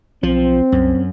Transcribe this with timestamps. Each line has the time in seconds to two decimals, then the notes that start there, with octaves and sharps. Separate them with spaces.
0.23 B1 F3 C4
0.72 C2 F#2